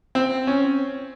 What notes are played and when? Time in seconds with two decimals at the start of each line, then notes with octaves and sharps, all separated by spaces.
0.15 C4
0.47 C#4